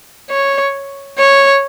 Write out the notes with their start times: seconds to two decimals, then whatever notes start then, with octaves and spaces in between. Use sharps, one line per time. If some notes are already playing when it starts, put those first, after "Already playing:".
0.30 C#5
1.19 C#5